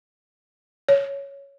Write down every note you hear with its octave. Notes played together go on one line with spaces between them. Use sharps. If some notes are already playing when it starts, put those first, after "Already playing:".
C#5